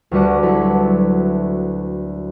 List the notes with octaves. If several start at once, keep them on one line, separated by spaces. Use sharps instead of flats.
D2 G3 F#4 B4 D5 F#5
F#3 E4 A4 B4